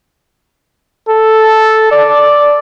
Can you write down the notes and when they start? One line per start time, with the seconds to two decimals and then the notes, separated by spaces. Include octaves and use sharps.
1.09 A4
1.91 D5